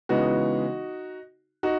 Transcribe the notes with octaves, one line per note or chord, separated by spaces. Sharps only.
C#3 E3 G#3 B3 D#4 F#4
D#4 F#4